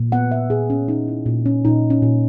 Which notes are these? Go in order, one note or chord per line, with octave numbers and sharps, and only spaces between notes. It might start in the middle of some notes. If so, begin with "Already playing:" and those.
Already playing: A#2
B3 F#5
E5
A#2 G#4
C#4
C#4 D#4
E4
A#2
C#4
A#2 D#4
C#4
A#2